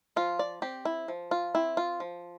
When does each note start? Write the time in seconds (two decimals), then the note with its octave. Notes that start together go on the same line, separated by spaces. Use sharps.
0.16 F3 F4
0.39 D5
0.62 C4 G4
0.85 E4
1.08 F3
1.31 F4
1.55 C4 E4
1.77 F4
2.00 F3